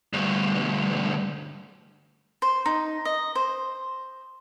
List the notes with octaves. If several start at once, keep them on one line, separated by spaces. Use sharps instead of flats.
D2 G2
C5
D#4
D#5
C5